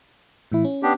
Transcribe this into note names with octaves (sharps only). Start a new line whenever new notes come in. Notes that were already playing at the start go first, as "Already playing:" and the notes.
A2 E3 E4
C#4
B3 D4 G4